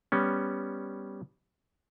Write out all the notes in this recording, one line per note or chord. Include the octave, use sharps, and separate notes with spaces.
G3 B3 C#4